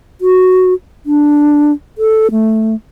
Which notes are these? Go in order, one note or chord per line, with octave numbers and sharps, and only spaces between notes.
F#4
D4
A4
A3